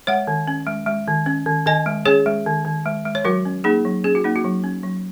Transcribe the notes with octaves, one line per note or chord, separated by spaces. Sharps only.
G#3 C#5 F#5
D#3
C#4
G#3
G#3
D#3
C#4
D#3
D#3 D#5 G#5
G#3
C#4 G#4 C#5
G#3
D#3
D#3
G#3
G#3
C#5
F#3 F#4 A#4
C#4
A#3 D#4 G#4
F#3
C#4 G#4
F#4
A#3 D#4
F#4
F#3
C#4
F#3